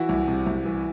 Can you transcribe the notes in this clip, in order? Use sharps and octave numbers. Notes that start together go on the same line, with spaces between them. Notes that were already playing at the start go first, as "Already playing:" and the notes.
Already playing: E3 E4 F#4
C2
C3
C2
E3